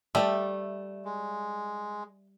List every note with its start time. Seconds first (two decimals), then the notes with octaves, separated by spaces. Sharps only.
0.15 G3 A3 D5 E5 G5
1.05 G#3